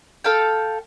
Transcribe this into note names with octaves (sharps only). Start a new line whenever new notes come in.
A4 F5 G5